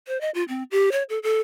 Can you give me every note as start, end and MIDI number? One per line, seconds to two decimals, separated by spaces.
0.08 0.20 72
0.21 0.30 75
0.34 0.44 65
0.48 0.63 60
0.71 0.90 67
0.92 1.03 73
1.09 1.19 69
1.23 1.41 69